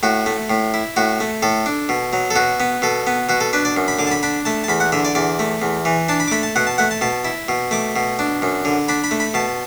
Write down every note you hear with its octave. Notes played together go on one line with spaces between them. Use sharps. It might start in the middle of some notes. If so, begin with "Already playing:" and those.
A2 F#4
A3
A2
E4
A2 F#4
A3
A2 A4
D4
B2
F#3
A4
B2 F#4
B3
B2 A4
B3
B2 F#4
A4
D4 B4
D5
F#2
B5
D3 D6
A5
B5
D4 B5
A3 A5
A5
E2 B5
F#5
D3 E5
D5
E2 D5
A3
E2
E3
D4 A5
B5
D6
A3 B5
A5
B2 F#5
A5
A3 F#5
A5
B2 A5
E4
B2
A3 D6
B2
D4
F#2
D3
D4 B5
B5
A3
B5
B2 A5